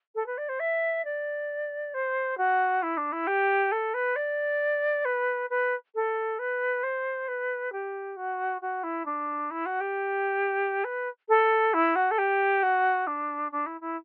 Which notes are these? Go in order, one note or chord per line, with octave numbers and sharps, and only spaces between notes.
A4
B4
D5
C5
E5
D5
C5
F#4
E4
D4
E4
G4
A4
B4
D5
B4
B4
A4
B4
C5
B4
G4
F#4
F#4
E4
D4
E4
F#4
G4
B4
A4
E4
F#4
A4
G4
F#4
D4
D4
E4
E4